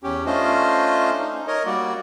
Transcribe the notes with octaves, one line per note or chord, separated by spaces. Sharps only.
E2 C#4 G4
A3 C#4 D4 F4 C5 D#5
D#4
A#4 C#5 D#5
G3 A#3 F#4 D5